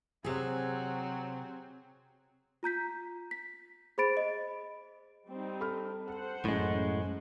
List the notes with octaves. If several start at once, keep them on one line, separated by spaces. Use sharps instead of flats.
C3 F#3 C4 G#4
F4 A#5 G6 B6
B6
G#4 C5 B5 A6 D7
D#5
G3 C4 D#4
A4 B5 F6
A4 C5 F#5
A1 F#2 A2 G#3